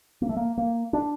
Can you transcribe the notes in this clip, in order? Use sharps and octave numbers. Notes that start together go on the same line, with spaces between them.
A#3
A3
A#3
A#3
D4